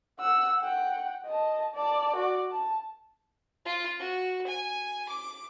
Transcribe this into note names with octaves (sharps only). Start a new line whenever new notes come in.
F#5 E6
F#5 G5
D#5 A5
D5 A5
F#4 D5
A5
F4
F#4
G#5
D6